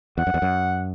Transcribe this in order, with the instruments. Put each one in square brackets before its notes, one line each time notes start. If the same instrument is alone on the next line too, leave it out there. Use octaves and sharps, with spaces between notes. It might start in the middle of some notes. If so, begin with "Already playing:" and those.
[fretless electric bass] E2 [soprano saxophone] F#5
[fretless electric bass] F#2
E2
F#2